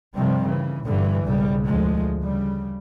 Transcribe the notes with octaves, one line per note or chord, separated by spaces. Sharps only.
G2 C3 D#3 F3 G3 C4
C#3 E3
G2 A#2 D3 E3 G3
B1 G#2 C#3 G3
D2 F3 G#3
C#3 G3